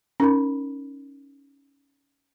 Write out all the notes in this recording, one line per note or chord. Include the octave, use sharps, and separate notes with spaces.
C#4 D#4 A#4 B5